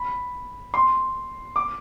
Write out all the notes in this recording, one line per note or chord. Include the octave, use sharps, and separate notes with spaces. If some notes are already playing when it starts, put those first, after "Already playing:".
Already playing: B5
C6
D6